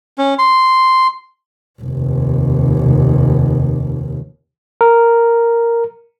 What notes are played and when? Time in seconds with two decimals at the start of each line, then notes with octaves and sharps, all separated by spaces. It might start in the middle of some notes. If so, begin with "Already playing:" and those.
0.18 C#4
0.39 C6
1.82 F1 D#2
4.81 A#4